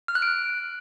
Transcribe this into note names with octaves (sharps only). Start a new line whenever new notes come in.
F6
F#6
D7